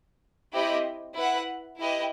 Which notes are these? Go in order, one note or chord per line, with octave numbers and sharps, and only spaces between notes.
C4 E4 G4 D#5
E4 B4 F#5
E4 G4 B4 D#5